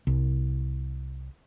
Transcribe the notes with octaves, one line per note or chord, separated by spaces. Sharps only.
C2